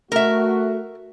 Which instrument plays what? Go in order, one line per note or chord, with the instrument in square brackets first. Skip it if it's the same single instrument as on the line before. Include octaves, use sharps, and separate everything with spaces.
[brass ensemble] A3 F#4 [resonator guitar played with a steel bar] A#4 E5